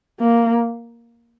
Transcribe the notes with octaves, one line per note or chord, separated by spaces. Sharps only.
A#3